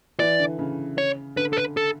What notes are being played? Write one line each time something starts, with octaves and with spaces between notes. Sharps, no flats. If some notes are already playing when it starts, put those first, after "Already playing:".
E3 D5
D3
C#3
C#5
D3 B4
A4
B4
A4